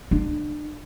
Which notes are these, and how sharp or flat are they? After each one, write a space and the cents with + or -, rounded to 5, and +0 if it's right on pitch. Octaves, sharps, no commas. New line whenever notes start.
D4 +35